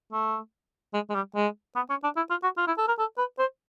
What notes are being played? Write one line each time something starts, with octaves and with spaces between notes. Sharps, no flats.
A3
G#3
G#3
G3
G#3
B3
C#4
D4
E4
F4
F#4
F4
E4
A4
A#4
A4
B4
C5